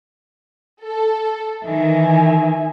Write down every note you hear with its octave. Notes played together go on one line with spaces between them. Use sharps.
A4
D#3 E3 E5 G#5